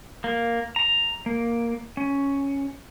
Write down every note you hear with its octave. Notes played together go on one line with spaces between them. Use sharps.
A#3
A#5
A#3
C#4